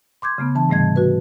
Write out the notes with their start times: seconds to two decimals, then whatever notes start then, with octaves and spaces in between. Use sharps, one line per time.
0.22 C6 D6 G6 G#6
0.38 C#3 A3 B3
0.55 E3 D4 A5
0.69 G#2 C3 G3 A3 D#5 G#6
0.96 F#4 B4